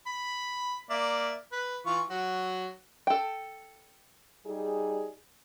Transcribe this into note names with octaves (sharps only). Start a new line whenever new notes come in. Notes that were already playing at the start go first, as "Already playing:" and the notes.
B5
A#3 D5 E5
B4
E3 F4 C#6
F#3 F#4
A4 G5
G3 D#4 G#4